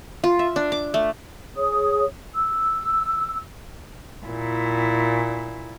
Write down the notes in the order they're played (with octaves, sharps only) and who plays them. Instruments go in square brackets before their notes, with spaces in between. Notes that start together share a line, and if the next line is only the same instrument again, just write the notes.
[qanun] F4
E5
D4
D6
A3
[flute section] G#4 C#5 D#6
E6
[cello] A#2 E4